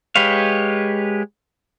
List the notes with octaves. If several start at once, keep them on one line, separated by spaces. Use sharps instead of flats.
G#3 G4 B4 C#5 F5